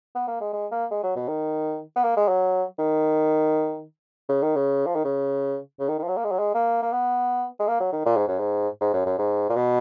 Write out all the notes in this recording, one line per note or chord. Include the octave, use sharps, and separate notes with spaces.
B3
A#3
G#3
G#3
A#3
G#3
F#3
B2
D#3
B3
A#3
G#3
F#3
D#3
C#3
D#3
C#3
F3
D#3
C#3
C#3
D#3
D#3
F3
F#3
A#3
G#3
F#3
G#3
A#3
A#3
B3
G#3
A#3
F#3
D#3
A#2
G#2
F#2
G#2
G#2
F#2
F#2
G#2
A#2
B2